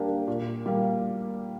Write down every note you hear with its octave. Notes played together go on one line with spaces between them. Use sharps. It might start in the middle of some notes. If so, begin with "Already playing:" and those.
Already playing: G3 A#3 D4 G4 A#4
A#2
G3 A#3